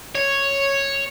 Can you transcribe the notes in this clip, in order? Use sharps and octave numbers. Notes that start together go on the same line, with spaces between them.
C#5